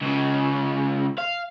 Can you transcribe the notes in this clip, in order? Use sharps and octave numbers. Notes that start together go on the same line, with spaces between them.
C#2 C#3
F5